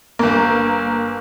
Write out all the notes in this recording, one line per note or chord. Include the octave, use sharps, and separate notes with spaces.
G1 A#3